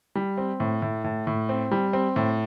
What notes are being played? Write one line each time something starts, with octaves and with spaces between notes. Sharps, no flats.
G3
C4
A2
A2
A2
A2
C4
G3
C4
A2